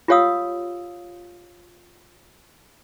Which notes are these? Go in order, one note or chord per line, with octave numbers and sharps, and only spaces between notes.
F4 G4 C#5 F5 D#6 E6